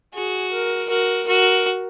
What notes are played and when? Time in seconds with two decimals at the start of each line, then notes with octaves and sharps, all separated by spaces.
0.14 F#4 G#4
0.52 A#4
0.89 F#4 A#4
1.28 F#4 A#4